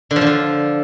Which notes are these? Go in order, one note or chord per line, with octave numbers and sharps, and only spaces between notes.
D3
F3
D3
F3